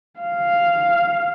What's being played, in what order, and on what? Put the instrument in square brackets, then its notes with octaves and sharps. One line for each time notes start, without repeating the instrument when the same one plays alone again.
[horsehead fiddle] F5